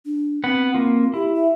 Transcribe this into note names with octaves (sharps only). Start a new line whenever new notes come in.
D4
B3 C4 F#5
A#3 F4
E4 G4
E5